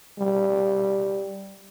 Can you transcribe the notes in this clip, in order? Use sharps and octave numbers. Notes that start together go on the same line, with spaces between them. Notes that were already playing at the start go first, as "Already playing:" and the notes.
G3